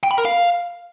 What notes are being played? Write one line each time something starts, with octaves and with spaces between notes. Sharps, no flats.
G5
B5
A#4
F5